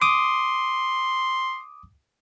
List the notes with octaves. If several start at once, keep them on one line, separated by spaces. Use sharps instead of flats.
C6 D6 D#6